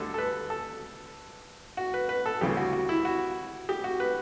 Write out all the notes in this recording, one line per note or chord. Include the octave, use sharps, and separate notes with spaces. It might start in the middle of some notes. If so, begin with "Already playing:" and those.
Already playing: D2 D3 G3 A4
A4
B4
A4
F#4
B4
B4
A4
D2 C#3 E3 G3 G4
F#4
F#4
E4
F#4
G4
F#4
B4